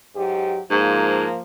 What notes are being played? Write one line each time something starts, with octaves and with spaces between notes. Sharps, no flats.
G#2 F#3 G4
G#2 F3 A#3